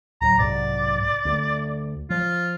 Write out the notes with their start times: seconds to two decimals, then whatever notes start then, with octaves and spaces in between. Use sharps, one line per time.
0.21 D1 F#3 A#5
0.39 B1 G#2 C3 D5
1.25 D2 A3
2.10 F3 F4